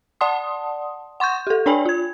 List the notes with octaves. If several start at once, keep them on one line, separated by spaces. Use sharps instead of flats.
D5 F#5 A5 C6 D#6
F#5 C6 C#6 G6
G4 A4
D4 C#5 D5 G5 G#5 B5
F4 G#6